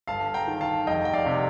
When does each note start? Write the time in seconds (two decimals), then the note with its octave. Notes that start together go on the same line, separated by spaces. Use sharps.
0.07 G1 F5 A5
0.34 G5 A#5
0.48 D#3
0.61 F5 A5
0.87 F1 D#5 G5
1.05 G5
1.13 D5 F5
1.26 C3